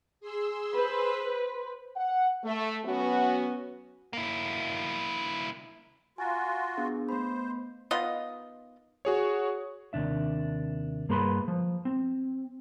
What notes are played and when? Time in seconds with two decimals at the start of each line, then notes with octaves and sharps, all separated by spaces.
0.20 G#4 C6 E6
0.73 B4 C5 B5
1.97 F#5
2.44 A3
2.85 F#3 B3 C#4 F#4
4.13 A#3 E4
6.18 F4 F#4 G#5 A#5
6.77 B3 D4 G#4
7.09 A3 B3 C5 B5
7.91 D#3 B3 F4 D#5
9.05 F#4 G#4 C#5
9.93 D#2 C3 D4 E5
11.09 G2 A#3 G#4 B4 B5 C6
11.48 F3
11.85 C4